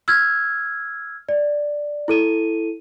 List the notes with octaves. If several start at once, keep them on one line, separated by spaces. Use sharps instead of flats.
E6 F6 G#6
D5
E4 A4 D#7